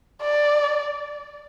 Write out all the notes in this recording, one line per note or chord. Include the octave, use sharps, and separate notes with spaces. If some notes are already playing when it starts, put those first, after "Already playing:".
D5